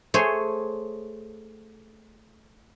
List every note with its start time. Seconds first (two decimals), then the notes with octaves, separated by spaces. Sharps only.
0.14 A3 G#4 C5 C#5